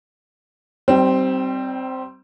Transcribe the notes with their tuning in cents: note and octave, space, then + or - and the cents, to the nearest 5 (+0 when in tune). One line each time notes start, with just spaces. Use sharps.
G3 -25 C4 +0 D#4 +0